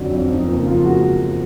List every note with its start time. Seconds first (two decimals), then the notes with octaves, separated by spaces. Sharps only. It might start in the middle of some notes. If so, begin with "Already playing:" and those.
Already playing: F2 D3 F#3 D4
0.12 F2
0.30 F3 D#4
0.48 F#1
0.66 F3 F4
0.84 G#3 F#4